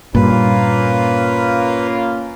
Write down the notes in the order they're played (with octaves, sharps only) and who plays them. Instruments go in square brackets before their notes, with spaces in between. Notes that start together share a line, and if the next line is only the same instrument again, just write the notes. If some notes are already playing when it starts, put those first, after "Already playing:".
[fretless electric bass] G2 A#2 [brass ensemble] A#3 C#4 F4 [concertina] B4